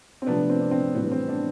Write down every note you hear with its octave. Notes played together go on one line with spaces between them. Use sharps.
C4
C3 F3 A3 B3 D4
C4
D4
C4
A2 E3 G3 B3
B3
C4
B3 D4